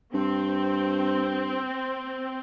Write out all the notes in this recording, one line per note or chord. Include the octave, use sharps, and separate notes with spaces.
G2 C4